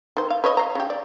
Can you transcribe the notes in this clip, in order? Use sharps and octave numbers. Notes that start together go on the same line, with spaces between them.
D#3 C5
F5
B4 C#5 D#5
F5 A#5
C#3 G4
D5